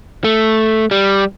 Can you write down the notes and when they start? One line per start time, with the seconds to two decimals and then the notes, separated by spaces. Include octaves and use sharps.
0.24 A3
0.91 G3